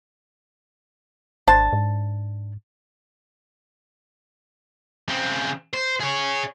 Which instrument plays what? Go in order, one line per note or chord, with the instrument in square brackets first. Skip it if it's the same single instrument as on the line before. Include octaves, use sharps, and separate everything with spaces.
[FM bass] G#1 [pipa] D4 C5 A5
[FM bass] G#2
[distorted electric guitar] C#3 C4
C5
G#4 C#5